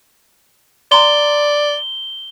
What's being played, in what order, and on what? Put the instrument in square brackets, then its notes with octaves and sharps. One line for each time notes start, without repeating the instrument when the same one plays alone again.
[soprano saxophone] D5 [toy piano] A#5 C6 [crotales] G7